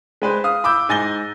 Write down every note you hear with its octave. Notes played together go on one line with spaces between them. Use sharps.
G#3 B4 C5
F5 D#6
B5 D6 E6 G6
G#2 G#5 A6 A#6 G7